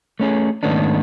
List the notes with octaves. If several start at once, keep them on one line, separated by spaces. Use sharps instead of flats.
A3 C#4 G#4
G#2 D#3 A3 B3 C#4 D4